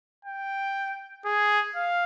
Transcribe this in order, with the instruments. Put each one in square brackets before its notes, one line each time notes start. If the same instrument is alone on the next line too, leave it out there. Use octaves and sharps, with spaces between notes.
[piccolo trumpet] G5
G#4
F5